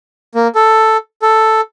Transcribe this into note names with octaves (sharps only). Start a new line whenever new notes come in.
A#3
A4
A4